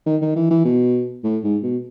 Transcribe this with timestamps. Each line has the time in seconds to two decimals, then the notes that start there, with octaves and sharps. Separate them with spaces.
0.06 D#3
0.22 D#3
0.36 E3
0.51 E3
0.65 B2
1.24 A2
1.44 G#2
1.63 B2